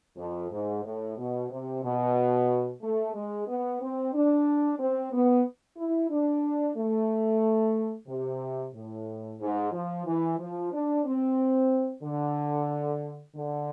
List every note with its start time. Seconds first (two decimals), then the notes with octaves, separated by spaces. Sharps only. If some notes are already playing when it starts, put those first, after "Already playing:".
0.17 F2
0.51 G#2
0.84 A2
1.17 B2
1.50 C3
1.83 B2
2.82 A3
3.14 G#3
3.48 B3
3.80 C4
4.14 D4
4.79 C4
5.13 B3
5.77 E4
6.10 D4
6.76 A3
8.08 C3
8.75 A2
9.41 G#2
9.73 F3
10.06 E3
10.38 F3
10.72 D4
11.05 C4
12.03 D3
13.36 D3